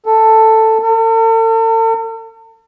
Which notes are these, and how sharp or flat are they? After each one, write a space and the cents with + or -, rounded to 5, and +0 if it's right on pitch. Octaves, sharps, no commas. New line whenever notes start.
A4 +10
A4 +45